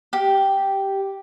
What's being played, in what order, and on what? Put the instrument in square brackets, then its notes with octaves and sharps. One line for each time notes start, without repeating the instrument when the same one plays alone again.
[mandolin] G4